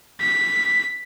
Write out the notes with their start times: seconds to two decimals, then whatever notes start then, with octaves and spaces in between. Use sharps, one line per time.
0.21 B6